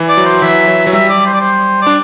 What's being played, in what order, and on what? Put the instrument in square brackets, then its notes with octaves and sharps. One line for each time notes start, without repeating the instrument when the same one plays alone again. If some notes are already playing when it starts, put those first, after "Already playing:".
Already playing: [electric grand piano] E3
[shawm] D5
[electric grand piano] F#3
[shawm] C5
[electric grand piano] E3 [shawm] E5
[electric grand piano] F#3
F#3
[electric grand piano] G3 [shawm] E5
[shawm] D5
C5
D5
C5
[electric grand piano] D4 [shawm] D5